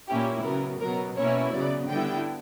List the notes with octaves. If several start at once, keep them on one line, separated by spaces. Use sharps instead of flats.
A#2 A#3 C#4 E4 G4
C#3 F#3 B3 A#4
B2 F#3 B3 A#4
B2 A#3 C#4 E4 C#5
C#3 F#3 B3 D5
D3 G3 B3 E4 G5